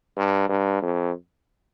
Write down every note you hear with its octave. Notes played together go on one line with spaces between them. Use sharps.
G2
G2
F2